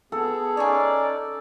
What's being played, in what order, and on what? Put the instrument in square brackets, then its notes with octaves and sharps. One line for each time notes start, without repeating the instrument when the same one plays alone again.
[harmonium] B3 G#4 [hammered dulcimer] A4
[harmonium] C#4 D#4 [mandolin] G#4 C#5 [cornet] D5